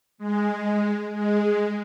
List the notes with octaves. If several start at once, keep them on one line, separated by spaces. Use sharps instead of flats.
G#3
G#3